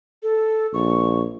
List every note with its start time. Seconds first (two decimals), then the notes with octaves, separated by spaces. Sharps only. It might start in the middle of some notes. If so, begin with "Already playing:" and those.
0.23 A4
0.74 A#1 C#6